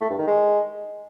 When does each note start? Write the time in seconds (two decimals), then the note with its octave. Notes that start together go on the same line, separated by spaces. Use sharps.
0.01 A3
0.10 G2
0.18 D#3
0.27 G#3